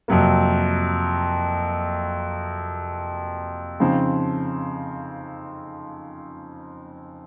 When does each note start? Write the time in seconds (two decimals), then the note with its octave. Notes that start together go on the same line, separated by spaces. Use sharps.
0.08 F2 C3 F#3 A#3
3.80 C#3 F3 C4 D#4